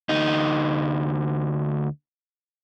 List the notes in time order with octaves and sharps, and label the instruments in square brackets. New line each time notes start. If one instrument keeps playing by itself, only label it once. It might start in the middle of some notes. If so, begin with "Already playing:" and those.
[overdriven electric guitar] D2 D#4